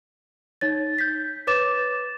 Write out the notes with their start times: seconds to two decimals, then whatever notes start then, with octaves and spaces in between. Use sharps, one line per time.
0.61 D#4 C#5 A6
0.98 G6 B6
1.47 B4 C#5 D6 A6 E7